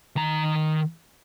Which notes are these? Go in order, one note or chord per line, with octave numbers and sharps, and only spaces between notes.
D#3 A#5